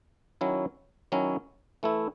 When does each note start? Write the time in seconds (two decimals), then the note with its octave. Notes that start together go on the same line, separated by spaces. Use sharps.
0.41 D#3 F#3 C#4 E4
1.12 D#3 F#3 C#4 E4
1.83 E3 A3 E4